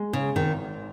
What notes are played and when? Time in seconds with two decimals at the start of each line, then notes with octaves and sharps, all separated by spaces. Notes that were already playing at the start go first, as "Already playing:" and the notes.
Already playing: G#3
0.13 C#3
0.36 G#1 D#3